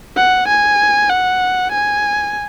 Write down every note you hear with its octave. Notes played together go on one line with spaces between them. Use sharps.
F#5
G#5
F#5
G#5